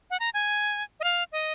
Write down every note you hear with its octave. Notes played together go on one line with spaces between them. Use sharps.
F#5
A#5
G#5
D#5
F5
D#5